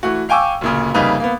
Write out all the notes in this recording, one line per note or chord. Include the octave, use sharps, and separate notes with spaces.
E3 A3 F#4
F5 G5 G#5 C#6 D6 E6
D1 A#2 C#3
F1 C#3 G3 A#3 D#4 B4
A#3 B3